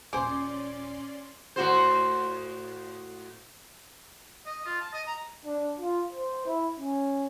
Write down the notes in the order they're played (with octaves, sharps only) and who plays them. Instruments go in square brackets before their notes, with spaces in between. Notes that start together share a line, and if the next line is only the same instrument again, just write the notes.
[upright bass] D#1 A#1 [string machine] C#4 D5 C6 [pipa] G#4 C5 [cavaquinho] D6
[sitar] A2 F#4 C5
[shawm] D#5
F4
A5
D#5
A#5
[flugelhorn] D4
F4
C5
E4
C#4